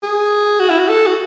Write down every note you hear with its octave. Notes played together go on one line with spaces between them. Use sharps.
G#4
F#4
E4
F#4
A4
F#4